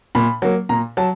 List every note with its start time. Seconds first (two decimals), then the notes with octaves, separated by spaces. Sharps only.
0.15 A#2 B5
0.42 F#3 A#3
0.69 A#2 A#5
0.97 F#3 A5